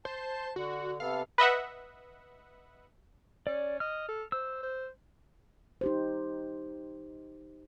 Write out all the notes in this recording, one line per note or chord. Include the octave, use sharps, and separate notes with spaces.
C5 A5
D3 F#4
C3 B3 A4 F5
B4 D#5 E5 F#5
C#4 D5
D#5 F6
A4
C5 E6
C5
D#4 G4 C5